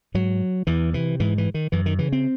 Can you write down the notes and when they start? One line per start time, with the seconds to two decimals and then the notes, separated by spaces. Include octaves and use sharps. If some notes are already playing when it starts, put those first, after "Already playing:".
0.14 G#2 F#3
0.67 E2 E3
0.93 C3 E3
1.20 G#2 E3
1.38 E3
1.54 D#3
1.72 F#2 E3
1.86 D#3
1.99 C#3 E3
2.12 C4